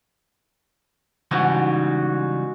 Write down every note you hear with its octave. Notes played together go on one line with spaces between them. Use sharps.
G#2 C#3 E3 G3 F#4